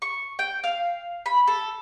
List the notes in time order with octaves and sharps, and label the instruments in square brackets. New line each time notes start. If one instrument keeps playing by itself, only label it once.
[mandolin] C#6
G5
F5
B5
A4